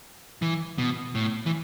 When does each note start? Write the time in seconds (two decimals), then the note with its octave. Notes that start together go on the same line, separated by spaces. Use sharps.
0.42 E3
0.78 B2
1.15 A2
1.46 E3